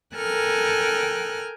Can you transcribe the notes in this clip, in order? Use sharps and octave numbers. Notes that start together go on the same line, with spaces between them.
A4 A#4 G5 G#5 F6 F#6